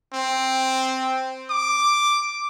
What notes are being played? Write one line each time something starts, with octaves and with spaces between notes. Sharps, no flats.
C4
D6